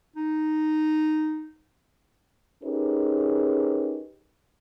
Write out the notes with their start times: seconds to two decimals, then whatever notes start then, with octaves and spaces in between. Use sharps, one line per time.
0.16 D#4
2.63 C#4 D#4 G4 G#4 A#4 B4